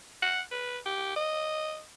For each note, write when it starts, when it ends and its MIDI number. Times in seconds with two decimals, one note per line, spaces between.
0.22 0.41 78
0.52 0.78 71
0.86 1.16 67
1.16 1.81 75